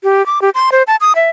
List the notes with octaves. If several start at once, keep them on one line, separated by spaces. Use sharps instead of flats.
G4
D6
G4
C6
C5
A5
D#6
E5